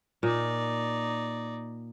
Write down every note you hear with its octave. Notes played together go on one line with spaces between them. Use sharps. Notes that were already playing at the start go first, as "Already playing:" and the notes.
A#2 D#4 D5